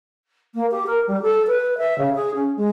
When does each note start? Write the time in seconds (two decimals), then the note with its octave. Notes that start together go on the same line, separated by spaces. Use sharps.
0.54 A#3
0.71 G4
0.86 A#4
1.07 G3
1.22 A4
1.47 B4
1.78 E5
1.98 C#3
2.15 G#4
2.34 C#4
2.56 G#3